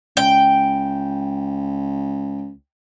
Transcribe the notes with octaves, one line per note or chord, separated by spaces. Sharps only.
C#2 G5